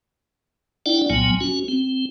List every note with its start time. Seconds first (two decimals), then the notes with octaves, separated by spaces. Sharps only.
0.86 D4 E4 D5 F#5 G5
1.10 C2 A#2 F#3 B3 G#5
1.40 C#4 F#4
1.68 C4